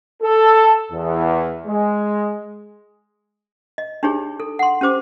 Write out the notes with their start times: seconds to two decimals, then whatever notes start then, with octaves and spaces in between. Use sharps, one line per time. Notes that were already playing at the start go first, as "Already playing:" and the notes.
0.22 A4
0.92 E2
1.67 G#3
3.78 D#5
4.03 D4 D#4 G4 G#4 C#5
4.40 A4
4.59 F#5 C6
4.81 C#4 G4 C5 D6